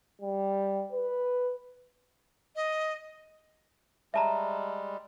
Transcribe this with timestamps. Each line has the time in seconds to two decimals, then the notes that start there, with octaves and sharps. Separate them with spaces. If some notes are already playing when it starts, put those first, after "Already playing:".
0.21 G3
0.92 B4
2.56 D#5
4.14 G3 G#3 E5 A5 A#5